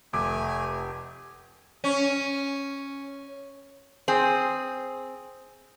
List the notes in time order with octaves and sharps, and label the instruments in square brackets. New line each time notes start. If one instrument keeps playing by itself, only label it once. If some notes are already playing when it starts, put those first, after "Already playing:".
[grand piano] F1 D6 [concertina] A3 G#5
[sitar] C#4
[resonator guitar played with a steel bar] C4 G#4